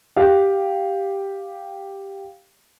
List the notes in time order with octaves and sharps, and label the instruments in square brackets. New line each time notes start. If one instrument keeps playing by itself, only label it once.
[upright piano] G4 F5